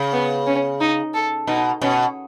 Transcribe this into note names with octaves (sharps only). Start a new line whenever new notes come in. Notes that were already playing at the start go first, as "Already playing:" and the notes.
Already playing: C#3
B3
C#4
D#4
A4
B2 D#4
B2 C#4